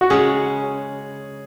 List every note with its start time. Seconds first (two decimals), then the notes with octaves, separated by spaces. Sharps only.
0.01 F#4
0.10 C#3 G#3 C#4 G#4